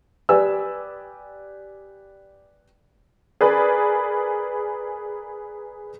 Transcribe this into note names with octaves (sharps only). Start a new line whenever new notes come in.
G4 B4 D5 G#5 E6
G#4 A#4 B4 D5 G#5